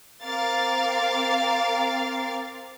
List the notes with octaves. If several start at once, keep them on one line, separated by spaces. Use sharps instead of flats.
C4 A#4 F5 D6 A6 C7